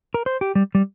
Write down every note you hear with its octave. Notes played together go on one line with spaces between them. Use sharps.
A#4
C5
G4
G3
G3